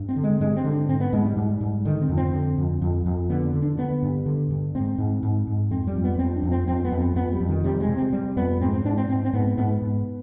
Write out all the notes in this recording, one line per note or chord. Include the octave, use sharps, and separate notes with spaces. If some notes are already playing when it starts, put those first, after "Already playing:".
Already playing: G2
C4
D3
G#3
G2 G#3
C4
D3
D4
G#2 C4
B3
G#2 G#3
G3
G#2
G#2
D3 D#3
C4
F2
C4
D3
F2
F2
F2
D3 B3
D3
D4
D3 B3
G2
D3
G2
G#2 C4
G#2
G#2
G#2
F2 C4
G3
F2
B3
F2 C4
D4
F2
C4
F2 C4
B3
F2
C4
F2 B3
G3
F2
D#3
C3 G3
G#3
C3
C4
C3 G3
F2 B3
G#2 C4
C4
G#2 D4
C4
G#2 C4
C4
G#2 B3
G#2 B3
G#2